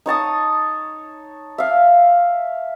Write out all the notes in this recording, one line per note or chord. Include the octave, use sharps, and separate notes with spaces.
D#4 C#5 A5 D#6
E5 F5